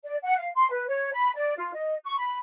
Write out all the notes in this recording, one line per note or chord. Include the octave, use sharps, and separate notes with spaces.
D5
F#5
F5
C6
B4
C#5
B5
D5
F4
D#5
C#6
B5